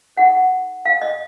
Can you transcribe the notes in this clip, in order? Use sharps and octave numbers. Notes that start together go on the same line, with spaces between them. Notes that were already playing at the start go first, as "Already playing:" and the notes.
D#4 G#4 C#5 F#5
F5
D#5